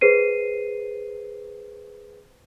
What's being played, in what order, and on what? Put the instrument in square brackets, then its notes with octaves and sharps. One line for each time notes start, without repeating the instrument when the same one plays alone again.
[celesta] G#4 B4 C5 C7 D#7